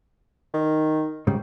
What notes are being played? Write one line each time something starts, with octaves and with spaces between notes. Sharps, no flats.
D#3
G#2 C#3 G3